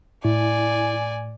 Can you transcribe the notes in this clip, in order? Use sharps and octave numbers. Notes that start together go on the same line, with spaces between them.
A2 E4 D5 G#5